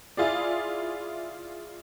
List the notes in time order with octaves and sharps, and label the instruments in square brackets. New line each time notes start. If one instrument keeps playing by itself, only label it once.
[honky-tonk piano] E4 F4 G#4 D5